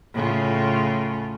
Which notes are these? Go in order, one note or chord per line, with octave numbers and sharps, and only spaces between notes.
A2 C#3 F4